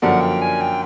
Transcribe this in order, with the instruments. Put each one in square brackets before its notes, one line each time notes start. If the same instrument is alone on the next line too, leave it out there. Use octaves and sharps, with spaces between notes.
[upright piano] F#2 D3 F3 A#3 D4 [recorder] F#5
[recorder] G5
G#5
G5